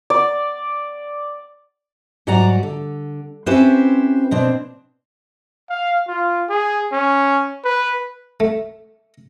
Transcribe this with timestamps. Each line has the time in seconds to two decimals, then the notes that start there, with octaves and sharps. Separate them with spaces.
0.10 D5
2.27 G#2 F#3 G3 D5 F#5 A#5
2.63 D3
3.46 C4 C#4 E4 G4 B4 C5
4.31 B2 C4 D4
5.70 F5
6.08 F4
6.49 G#4
6.92 C#4
7.64 B4
8.40 A3